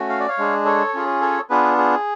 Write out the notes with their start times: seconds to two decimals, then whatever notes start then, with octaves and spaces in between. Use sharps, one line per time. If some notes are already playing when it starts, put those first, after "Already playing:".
Already playing: A3 C#4 F#4
0.10 F5
0.20 D5
0.28 C#5 F5
0.38 G#3 D4 G#4
0.65 A4 C#5
0.94 C#4 F4 G#4
1.21 A4 C#5
1.50 B3 D4 F4 G#4 B4
1.78 G#4